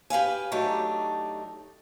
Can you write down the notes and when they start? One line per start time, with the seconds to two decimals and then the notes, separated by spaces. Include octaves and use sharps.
0.10 G4 B4 F5 G#5
0.52 F#3 A3 D4 D#4 G4